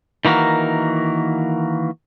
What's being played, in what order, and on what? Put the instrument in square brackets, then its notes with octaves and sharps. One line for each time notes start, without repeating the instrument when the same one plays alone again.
[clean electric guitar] D#3 E3 A#3 F#4 A#4